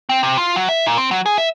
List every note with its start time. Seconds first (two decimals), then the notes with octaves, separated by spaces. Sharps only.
0.09 C4
0.23 C3
0.37 F4
0.56 F#3
0.69 E5
0.86 A#2
0.98 C4
1.11 F#3
1.26 G#4
1.38 E5